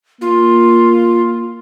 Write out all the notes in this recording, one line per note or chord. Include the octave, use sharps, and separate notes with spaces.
A#3 F4